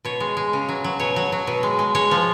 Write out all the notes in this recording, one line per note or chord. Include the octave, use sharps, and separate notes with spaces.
B2 C#5
G#3
G#3
C#3
F#3
F#3
B2 C#5
F#3
F#3
B2
G#3
G#3
G#3 C#5
F3